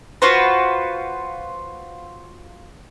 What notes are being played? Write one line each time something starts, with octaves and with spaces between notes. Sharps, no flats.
F4 F#4 B4 C5